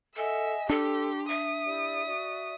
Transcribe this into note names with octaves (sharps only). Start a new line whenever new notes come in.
A4 D#5 E5 F#5 G#5
D4 G4 A4 C6
E5 D#6
E4 G4 D5
F#4 D5